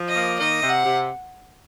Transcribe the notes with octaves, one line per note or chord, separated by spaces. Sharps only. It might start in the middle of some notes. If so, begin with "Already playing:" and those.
Already playing: F3
D#5
A#3
D#3 D#5
C3
F#5
C3